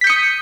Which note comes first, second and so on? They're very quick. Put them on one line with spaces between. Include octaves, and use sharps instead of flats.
B6 G6 C#7 D#6